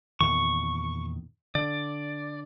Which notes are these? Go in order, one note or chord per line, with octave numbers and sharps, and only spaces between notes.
E2 A#2 D#3 C#6
D3 D5